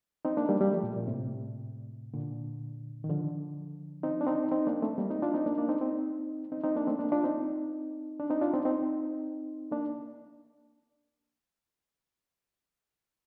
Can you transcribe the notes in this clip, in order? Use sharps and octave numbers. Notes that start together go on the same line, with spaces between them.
C4 D#4
A#3 D4
G3 A#3
G3 A#3
F3 A3
A#2
A#2
A2 C3
A#2 D3
D#3
D3 F3
C4 D#4
D4
C4 D#4
C4 D#4
A#3 D4
A3 C4
G3 A#3
C4 D#4
D4 F4
C4 D#4
A#3 D4
A#3 D4
C4 D#4
C4 D#4
C4 D#4
C4 D#4
A#3 D4
A3 C4
A#3 D4
D4 F4
C4 D#4
D4
C4 D#4
D4 F4
C4 D#4
C4 D#4
A#3 D4